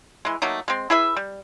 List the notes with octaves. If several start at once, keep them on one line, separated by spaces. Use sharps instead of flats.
E3 G#3
F#3 A3 A#3 D#4
G#3 C4
E4 G#4 B4 E5
G3